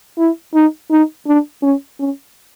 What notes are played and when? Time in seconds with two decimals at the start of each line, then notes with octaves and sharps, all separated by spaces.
0.18 E4
0.54 D#4
0.91 D#4
1.27 D4
1.62 C#4
1.99 C#4